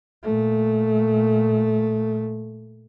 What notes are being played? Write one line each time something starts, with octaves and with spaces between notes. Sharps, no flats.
A#2 A3